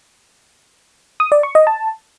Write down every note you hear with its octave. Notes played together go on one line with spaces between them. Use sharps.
D#6
D5
C#6
D#5
A5